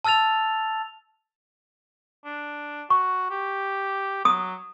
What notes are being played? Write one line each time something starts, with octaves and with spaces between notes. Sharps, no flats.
A5 E6 F6 A6 F7
D4
F#4 C#6
G4
F#3 D#6